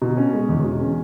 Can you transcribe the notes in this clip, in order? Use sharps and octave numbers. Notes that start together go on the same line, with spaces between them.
B2
C#4
G#3
E2
B2
C#4